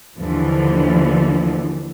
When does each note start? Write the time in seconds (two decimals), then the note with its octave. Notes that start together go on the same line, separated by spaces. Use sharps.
0.18 D#2 D3 E3 F3